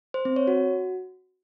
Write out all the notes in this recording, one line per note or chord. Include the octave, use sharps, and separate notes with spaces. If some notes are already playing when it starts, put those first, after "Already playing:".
C5
C4
C#5
F#4